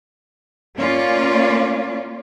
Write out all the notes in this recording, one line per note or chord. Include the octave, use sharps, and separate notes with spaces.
A#3 C#4 F4 D5